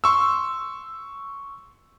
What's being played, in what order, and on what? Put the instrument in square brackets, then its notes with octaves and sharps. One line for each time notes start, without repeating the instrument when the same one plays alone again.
[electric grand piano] C6 C#6 E6